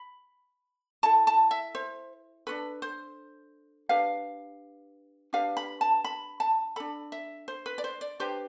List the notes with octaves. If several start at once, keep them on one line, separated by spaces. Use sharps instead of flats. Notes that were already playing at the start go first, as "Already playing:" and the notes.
Already playing: B5
E4 A4 A5
A5
E5
C5
D4 F4 A4 B4
C5
D4 G4 B4 F5
D4 G4 B4 F5
B5
A5
B5
A5
D4 A4 B5
E5
C5
B4
D5
C5
D5
D4 G4 B4 C5